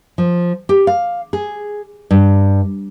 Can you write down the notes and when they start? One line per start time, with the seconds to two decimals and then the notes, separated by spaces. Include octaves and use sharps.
0.18 F3
0.69 G4
0.87 F5
1.33 G#4
2.11 G2